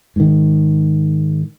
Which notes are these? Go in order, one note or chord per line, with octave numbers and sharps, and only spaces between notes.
G#2 D#3